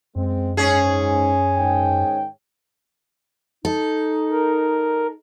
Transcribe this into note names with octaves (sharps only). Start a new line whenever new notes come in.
F#2 G#3 C4
G#2 C#4 G#4
G#2 D#3 G5
D#4 A4
A#4